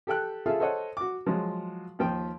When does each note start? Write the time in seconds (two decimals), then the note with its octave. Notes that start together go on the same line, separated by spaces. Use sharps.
0.07 G4 A4 G5 F#6
0.46 F4 G#4 A4 E5 F5
0.60 A4 C5 C#5 D#5 F#5
0.97 F#4 D6
1.26 F3 F#3 G#3
1.99 D#2 F3 G5